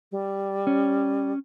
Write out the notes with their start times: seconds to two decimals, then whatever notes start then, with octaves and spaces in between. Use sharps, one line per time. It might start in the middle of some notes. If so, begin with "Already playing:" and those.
0.12 G3
0.67 C#4